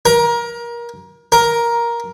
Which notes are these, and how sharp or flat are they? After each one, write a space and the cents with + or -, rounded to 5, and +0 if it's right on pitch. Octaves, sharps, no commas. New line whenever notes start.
A#4 +25
A#4 +10